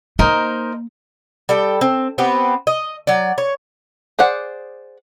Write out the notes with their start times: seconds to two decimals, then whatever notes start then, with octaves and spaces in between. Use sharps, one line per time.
0.19 A#3 D#4 A#4 C5
1.49 G3 A4 G5
1.81 C4
2.18 B3 C4 G4 B4
2.67 D#5
3.07 F#3 D5
3.38 C#5
4.19 G#4 C5 D5 F#5